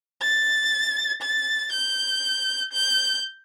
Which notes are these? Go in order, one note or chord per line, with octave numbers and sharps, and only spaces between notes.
A6
A6
G6
G6